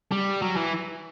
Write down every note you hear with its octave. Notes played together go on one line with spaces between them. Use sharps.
G3
F#3
E3